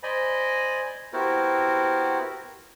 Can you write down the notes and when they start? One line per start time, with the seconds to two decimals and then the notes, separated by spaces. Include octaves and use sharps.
0.03 C5 D5 D#5 G#5 B5
1.13 B3 E4 F#4 G4 A#4 C5